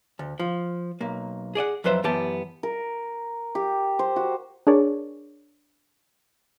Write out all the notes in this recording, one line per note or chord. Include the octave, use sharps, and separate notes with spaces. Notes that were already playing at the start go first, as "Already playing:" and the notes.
D2
F3
B1 A#3
G#4 D5 D#5 F#5
F2 F#3 B4 C5 E5
F#2 E3 B3 G4 A5
A#4
G4
C5
F#4
D4 G#4 A#4 C#5 D5